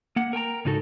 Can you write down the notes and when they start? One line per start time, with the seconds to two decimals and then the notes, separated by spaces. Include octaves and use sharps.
0.16 A#3 F#5
0.33 A#4 G5 G#5 A#5
0.65 G#2 C#3 D#4 F#4 A4